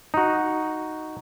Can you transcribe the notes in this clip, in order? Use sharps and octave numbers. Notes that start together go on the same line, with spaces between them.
D#4 F#4